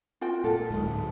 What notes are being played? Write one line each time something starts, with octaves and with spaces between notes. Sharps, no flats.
F4 F#4 G5
A#2 A4
D1 G#2